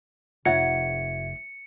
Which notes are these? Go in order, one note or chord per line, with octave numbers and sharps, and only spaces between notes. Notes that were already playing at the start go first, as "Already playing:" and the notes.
F1 F4 C#5 E5 F#5 G#6 C#7